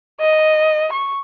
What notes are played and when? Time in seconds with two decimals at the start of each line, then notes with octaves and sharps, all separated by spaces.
0.21 D#5
0.93 C#6